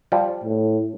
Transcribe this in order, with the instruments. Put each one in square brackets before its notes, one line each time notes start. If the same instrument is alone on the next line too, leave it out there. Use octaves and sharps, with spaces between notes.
[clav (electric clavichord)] F3 G3
[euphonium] A2